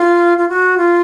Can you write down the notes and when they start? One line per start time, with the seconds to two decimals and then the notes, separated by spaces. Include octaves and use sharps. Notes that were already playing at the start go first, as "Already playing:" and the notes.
Already playing: F4
0.38 F4
0.49 F#4
0.78 F4